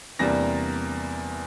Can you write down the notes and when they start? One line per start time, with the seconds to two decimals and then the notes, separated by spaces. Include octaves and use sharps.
0.19 E2 C3 G3 A#3 D4 A#6